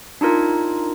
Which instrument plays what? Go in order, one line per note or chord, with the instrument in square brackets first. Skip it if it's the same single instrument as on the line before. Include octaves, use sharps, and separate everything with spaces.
[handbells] D4 D#4 F4 A#4